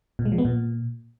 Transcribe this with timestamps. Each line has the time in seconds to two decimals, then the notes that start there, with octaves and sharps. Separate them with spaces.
0.19 A#2
0.25 G#3
0.32 F3
0.38 B3
0.45 A#2